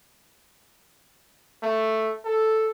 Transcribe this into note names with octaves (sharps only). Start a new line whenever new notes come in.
A3
A4